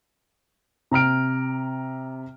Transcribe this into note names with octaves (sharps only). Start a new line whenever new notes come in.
C3 A#5 F6 D7